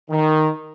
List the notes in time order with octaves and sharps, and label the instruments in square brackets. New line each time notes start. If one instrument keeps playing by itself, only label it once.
[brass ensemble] D#3